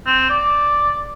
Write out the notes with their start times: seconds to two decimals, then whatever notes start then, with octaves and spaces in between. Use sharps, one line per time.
0.06 C4
0.30 D5